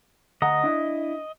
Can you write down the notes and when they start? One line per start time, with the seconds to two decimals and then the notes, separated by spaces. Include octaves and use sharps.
0.42 D2 D#5 F#5 A#5
0.64 D4 E4